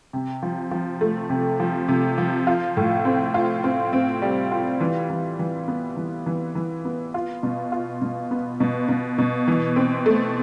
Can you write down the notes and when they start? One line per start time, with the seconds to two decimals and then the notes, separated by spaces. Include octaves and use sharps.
0.13 C3
0.43 F3
0.71 F3
1.01 A3
1.30 C3
1.60 F3
1.88 C3
2.18 F3
2.47 F4
2.77 A2
3.05 C4
3.34 F4
3.64 C4
3.93 C4
4.22 G3
4.52 F4
4.80 E3
5.10 E3
5.39 E3
5.68 B3
5.97 E3
6.26 E3
6.55 E3
6.85 B3
7.14 F4
7.43 B2
7.72 F4
8.02 B2
8.31 B3
8.60 B2
8.89 B2
9.18 B2
9.48 E3
9.76 C4
10.06 A3